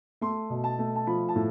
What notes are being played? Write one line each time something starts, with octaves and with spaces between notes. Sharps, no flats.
A3 C6
B2
A5
A3
A5
F3 B5
A5
A2